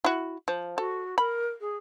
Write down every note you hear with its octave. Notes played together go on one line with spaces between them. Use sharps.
E4 F#4
F3
F#4 A4
A#4 B5
G#4